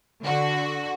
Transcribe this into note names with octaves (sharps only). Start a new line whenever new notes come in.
D3 F#4